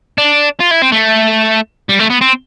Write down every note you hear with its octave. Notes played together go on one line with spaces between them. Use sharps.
D4
F4
E4
C4
A3
G3
A3
B3
C4